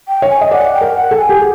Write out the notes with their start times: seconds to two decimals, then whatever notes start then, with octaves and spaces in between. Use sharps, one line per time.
0.08 G5
0.22 C#5
0.30 G#5
0.41 D#5
0.51 D5 F#5
0.74 G5
0.81 A#4
0.96 F#5
1.11 A4
1.18 G#5
1.29 G4
1.39 G#4